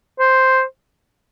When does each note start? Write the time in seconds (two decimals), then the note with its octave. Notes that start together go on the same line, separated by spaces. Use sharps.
0.19 C5